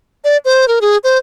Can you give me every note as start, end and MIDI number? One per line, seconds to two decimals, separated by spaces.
0.24 0.37 74
0.45 0.68 72
0.68 0.79 70
0.81 0.97 68
1.04 1.18 72